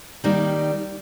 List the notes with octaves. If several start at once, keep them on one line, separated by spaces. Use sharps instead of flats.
D#3 G3 A#3 D#4